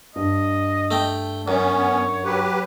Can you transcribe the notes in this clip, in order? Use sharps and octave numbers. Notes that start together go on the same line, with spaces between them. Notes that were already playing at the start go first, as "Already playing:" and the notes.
G2 D#5
A3 G5
F#2 B3 C#4 C#5
F#3 G4 B4